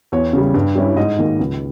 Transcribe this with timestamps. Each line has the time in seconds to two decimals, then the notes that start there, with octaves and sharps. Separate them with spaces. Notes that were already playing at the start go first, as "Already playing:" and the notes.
0.12 E2 C#5
0.33 C#3 G3
0.54 G2
0.75 G3 C#4 E4
0.97 G#2 D#5
1.19 D#3 A#3
1.40 C#2